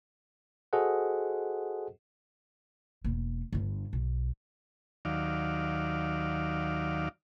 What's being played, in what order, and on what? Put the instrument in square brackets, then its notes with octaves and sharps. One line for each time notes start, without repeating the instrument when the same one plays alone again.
[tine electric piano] F#4 G#4 A4 C5 D#5 F#5
[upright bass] E1 A#3
G1 D4
B1
[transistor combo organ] D#2 D#3 F#3 D5 F5